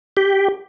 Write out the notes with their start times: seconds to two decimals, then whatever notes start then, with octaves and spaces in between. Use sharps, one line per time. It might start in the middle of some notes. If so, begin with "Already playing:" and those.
0.17 G4